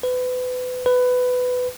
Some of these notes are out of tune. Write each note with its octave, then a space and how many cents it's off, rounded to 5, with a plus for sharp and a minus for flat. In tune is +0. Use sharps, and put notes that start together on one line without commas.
B4 +30
B4 +15